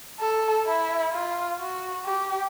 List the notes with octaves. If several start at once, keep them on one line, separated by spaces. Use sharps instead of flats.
A4
E4
F4
F#4
G4